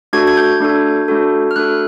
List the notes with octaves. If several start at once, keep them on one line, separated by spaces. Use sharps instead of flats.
A3 D4 F#4 A4 G#6
G#6
G6
A3 D4 F#4 A4
A3 D4 F#4 A4
F6
A3 D4 F#4 A4 F#6